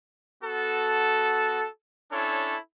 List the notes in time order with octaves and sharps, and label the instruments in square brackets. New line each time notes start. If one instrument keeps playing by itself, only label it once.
[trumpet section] B3 F#4 A4
C#4 D4 E4 A4 C#5